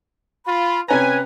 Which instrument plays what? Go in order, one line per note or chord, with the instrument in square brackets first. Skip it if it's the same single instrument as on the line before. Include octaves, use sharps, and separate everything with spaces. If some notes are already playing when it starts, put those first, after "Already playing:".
[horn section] F4 [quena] B5
[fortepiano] C3 C#4 A#5 [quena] B4 [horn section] G#5